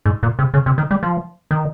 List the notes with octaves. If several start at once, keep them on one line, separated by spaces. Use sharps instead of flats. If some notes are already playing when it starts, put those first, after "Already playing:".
G#2
A#2
C3
C#3
C3
D#3
G3
F3
D#3